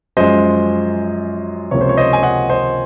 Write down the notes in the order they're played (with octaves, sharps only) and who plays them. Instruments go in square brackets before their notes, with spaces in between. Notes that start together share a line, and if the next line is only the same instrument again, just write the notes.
[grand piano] F#2 F3 G#3 C5 D#5
C#2 C3 F3 A#3 C#5
C5
C#5
C5 D#5
G#5
D#5 F#5
C5 D#5